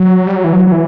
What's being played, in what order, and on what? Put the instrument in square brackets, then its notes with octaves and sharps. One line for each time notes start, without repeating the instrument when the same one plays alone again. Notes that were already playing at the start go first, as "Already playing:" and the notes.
Already playing: [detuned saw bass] F#3
G3
F#3
E3
F#3
F#3
E3